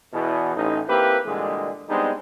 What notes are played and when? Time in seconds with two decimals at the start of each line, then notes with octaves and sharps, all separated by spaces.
0.13 E2 B2 E3
0.56 A1 D#4
0.88 A#3 C4 E4 G4 B4
1.26 A#2 D3 E3 G3 G#3
1.89 G3 G#3 B3 C4 D4 D#4